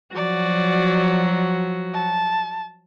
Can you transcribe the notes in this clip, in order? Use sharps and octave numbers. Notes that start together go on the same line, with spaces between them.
F3 F#3 F#4 D5
A5